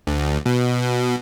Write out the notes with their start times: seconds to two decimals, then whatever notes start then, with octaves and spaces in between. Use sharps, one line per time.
0.07 D2
0.46 B2